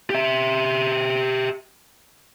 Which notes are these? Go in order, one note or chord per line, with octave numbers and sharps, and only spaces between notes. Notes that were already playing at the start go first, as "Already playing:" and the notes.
G4 E5